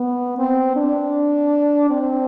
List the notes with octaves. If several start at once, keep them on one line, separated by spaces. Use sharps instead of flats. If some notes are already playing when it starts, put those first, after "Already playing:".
Already playing: B3
C4
D4
C4